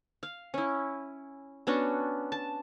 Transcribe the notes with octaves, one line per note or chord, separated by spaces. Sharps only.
F5
C#4 E4
B3 C#4 D4 F#4
A5